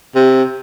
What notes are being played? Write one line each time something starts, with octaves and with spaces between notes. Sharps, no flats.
C3